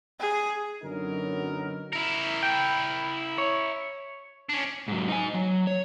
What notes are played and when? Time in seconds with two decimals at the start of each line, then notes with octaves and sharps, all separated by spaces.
0.20 G#4
0.83 F#2 D3 F#3 B3 D#4 A#4
1.93 E4 A#4
2.43 G5
3.38 C#5
4.49 C#4 D4
4.88 G#2 F#3
5.08 D#4 G#5
5.34 F#3
5.67 C#5